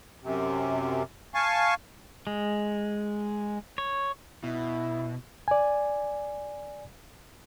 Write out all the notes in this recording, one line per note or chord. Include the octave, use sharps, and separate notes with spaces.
F#2 C3
F5 G#5 A5 C#6
G#3
C#5
B2 E4
D5 G#5